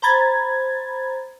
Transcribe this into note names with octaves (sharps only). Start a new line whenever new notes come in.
C5 A#5 B5 G#6 A6